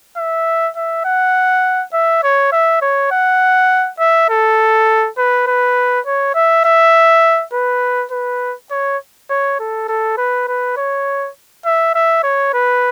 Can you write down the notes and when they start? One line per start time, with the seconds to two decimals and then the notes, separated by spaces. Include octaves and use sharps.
0.17 E5
0.77 E5
1.05 F#5
1.93 E5
2.23 C#5
2.52 E5
2.82 C#5
3.11 F#5
4.00 E5
4.30 A4
5.18 B4
5.47 B4
6.06 C#5
6.35 E5
6.65 E5
7.53 B4
8.12 B4
8.71 C#5
9.30 C#5
9.60 A4
9.89 A4
10.18 B4
10.48 B4
10.77 C#5
11.66 E5
11.95 E5
12.24 C#5
12.54 B4